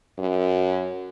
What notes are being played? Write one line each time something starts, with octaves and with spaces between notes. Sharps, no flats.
F#2